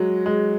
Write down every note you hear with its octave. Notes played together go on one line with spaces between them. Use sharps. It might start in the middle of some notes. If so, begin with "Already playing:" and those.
Already playing: F#3 G#3
G#3